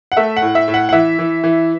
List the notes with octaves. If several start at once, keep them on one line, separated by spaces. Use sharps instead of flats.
F#5
A3 E5
F#5
A2
E5
A2
F#5
F#5
E3 E5
E3
E3